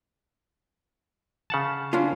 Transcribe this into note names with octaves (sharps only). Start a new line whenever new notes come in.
C#3 F#5 A5
C#4 D4 F4